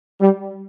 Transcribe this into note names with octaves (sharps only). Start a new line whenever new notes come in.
G3